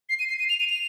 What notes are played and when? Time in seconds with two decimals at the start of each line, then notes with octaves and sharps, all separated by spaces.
0.09 C7
0.19 D#7
0.29 C7
0.39 D#7
0.49 F7
0.60 D#7
0.69 F7